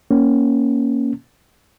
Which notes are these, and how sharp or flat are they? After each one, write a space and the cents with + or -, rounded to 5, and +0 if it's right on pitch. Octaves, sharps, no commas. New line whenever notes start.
A#3 +10 C#4 +0